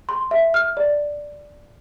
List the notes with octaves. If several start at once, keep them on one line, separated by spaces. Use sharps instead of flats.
C6
E5
F6
D5